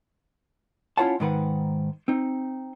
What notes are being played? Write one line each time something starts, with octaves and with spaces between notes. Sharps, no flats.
C#4 E4 F4 C#5 F#5 A5
G#2 D#3 B4 F#5
C4 D#4